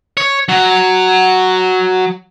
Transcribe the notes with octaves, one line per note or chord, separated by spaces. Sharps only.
C#5
F#3